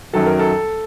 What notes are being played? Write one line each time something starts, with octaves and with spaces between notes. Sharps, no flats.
F#2 D#3 F#3 A4
A#4
A4